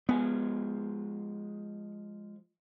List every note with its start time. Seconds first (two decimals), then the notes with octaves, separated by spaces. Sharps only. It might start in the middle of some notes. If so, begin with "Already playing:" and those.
0.09 F3 G#3 B3 G#5